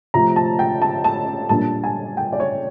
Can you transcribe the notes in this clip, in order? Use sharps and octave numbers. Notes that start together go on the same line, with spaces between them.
C3 F3 A3 A#5
A5
G5
A5
A5
A#2 G3 A#3 D4 A5
G#5
G5
D5
C#5